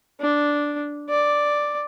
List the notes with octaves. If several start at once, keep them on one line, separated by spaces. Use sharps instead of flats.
D4
D5